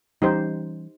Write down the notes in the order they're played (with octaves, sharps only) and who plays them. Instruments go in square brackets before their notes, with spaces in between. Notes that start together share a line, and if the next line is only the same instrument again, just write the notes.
[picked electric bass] E3 G3 C#4 [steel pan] D#4 G4 C5